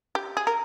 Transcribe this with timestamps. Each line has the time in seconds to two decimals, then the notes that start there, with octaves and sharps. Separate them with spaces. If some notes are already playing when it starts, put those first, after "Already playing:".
0.15 G4
0.37 G#4
0.47 A#4